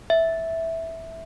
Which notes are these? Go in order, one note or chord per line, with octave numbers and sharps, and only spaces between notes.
E5